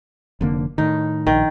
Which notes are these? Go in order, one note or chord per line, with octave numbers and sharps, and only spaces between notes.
F1 D3 A#3
A2 D#3 D#4
A#1 D#3